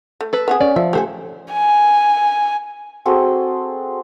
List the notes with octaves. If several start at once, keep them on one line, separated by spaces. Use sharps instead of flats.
A3
A4 B4
B3 C4 G#4
C#4 D5
F3 E5
A3 G4 C5 G#5
G#5
C4 F#4 G#4 A4